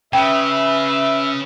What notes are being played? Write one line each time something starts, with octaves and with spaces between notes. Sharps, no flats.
C#3 B4 E5 G5